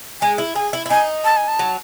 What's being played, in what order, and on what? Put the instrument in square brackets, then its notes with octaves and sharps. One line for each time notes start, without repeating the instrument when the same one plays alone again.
[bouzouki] G#3 [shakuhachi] G#5
[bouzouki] E4
[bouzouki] G#4 [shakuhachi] G#5
[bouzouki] E4
E4
[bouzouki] D#4 [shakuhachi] G#5
[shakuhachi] A5
G#5
A5
[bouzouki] F#3